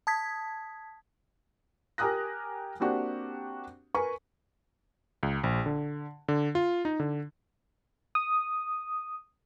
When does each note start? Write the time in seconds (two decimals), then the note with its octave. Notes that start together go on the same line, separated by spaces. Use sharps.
0.07 A5 D#6 G#6 B6
1.98 G4 A#4 G#5 D#6 F#6 A#6
2.80 A#3 C4 D4 F#4 G4
3.94 A#4 B4 G#5 C#6
5.23 C#2
5.44 A#1
5.66 D3
6.28 D3
6.55 F4
6.85 D#4
7.00 D3
8.15 D#6